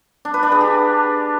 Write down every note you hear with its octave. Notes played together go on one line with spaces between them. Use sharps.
D4
B4
D4
G#4
G4